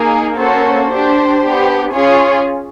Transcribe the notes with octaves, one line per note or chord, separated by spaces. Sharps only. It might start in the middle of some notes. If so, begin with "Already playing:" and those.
Already playing: A#3 D#4 G#4
A#3 C#4 F#4 A4 C5
D4 G4 C5
B3 D4 G4
C#4 F4 G#4 C#5